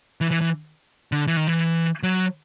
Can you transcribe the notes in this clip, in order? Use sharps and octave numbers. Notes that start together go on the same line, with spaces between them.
E3
E3
E3
D3
E3
D#3
E3
F#3